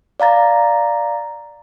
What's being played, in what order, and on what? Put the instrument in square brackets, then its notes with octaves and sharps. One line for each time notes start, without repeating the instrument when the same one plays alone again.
[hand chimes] D5 F5 A#5 A6